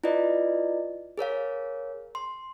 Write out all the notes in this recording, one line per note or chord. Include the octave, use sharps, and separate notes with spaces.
E4 F4 B4 D5 D#5
G#4 A#4 C#5 F5
C6